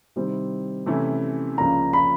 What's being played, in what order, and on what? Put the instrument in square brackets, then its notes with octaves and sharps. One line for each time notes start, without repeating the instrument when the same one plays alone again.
[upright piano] C3 D#3 G3 C4 E4
C3 E3 A3 C#4 E4
[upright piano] C#2 C#3 F3 A#3 D4 [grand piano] A#5
[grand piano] B5